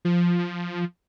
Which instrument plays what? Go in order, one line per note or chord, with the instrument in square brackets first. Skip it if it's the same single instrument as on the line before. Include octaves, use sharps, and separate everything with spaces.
[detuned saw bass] F3